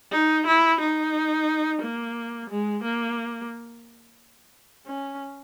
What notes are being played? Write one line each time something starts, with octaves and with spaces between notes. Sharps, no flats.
D#4
E4
D#4
A#3
G#3
A#3
C#4